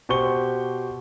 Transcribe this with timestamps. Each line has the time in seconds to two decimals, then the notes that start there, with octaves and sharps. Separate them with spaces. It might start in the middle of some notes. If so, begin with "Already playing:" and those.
0.09 B2 G4 C5 C#6 G7